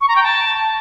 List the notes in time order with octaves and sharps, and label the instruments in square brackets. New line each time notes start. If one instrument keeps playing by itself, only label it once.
[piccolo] C#6
A#5
G5
A5